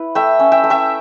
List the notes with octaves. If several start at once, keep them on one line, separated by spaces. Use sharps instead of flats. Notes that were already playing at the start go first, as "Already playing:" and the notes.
Already playing: E4 B4
A3 E5 G5
C#4
E5 G5
A3
E5 G5